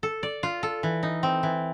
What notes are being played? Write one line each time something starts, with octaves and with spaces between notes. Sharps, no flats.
A4
D5
F4
A4
E3
D#4
C4
E3